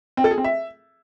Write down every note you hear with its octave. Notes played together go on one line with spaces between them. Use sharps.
C4
A4
G#4
C4
E5